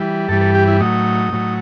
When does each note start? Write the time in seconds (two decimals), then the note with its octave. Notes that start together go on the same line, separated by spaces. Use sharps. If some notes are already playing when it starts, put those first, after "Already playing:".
Already playing: E3 G3
0.29 G2 E3 G3 A4
0.41 A4
0.55 G4
0.68 E4
0.80 A2 F#3 D#4
1.32 A2 F#3